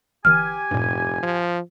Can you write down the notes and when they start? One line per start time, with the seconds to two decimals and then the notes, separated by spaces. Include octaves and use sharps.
0.25 G1 E3 G4 G#5 F6
0.71 F1 G2 A#2
1.23 F3